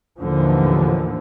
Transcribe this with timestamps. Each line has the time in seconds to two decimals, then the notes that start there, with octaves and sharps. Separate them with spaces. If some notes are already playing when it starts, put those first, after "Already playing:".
0.18 D#2 A2 D3 E3 F3